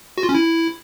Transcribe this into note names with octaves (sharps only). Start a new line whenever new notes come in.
F#4
F4
C#4
E4